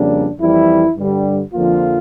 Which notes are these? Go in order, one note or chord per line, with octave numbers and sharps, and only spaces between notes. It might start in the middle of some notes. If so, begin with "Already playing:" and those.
Already playing: F2 C#3 G3 A#3 D4
F2 E3 G3 E4
G2 D3 G3
F2 D3 F3 A#3 F4